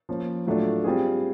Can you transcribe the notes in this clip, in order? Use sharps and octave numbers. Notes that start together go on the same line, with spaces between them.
F3 A#3 C#4
A2 F#3 A3 D4 F4
G3 C4 F4 G#4